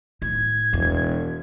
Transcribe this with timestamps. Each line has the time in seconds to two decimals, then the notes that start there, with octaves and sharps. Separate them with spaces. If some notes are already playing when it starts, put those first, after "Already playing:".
0.22 A2 G#6
0.73 E1 E2